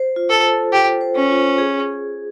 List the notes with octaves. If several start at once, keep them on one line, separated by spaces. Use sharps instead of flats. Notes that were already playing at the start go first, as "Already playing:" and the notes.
Already playing: C5
F4
A4
A4
F4 G4
C5
C#4
F4
G#4